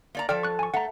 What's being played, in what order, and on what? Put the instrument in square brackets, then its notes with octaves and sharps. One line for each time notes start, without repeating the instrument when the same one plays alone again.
[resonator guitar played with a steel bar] A#3 D5 A#5
[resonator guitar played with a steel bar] F3 A4 [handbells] D5 G5 F6
[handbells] C#6 F#6
G#5 C#6
[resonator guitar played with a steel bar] A3 [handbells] F#5 A#5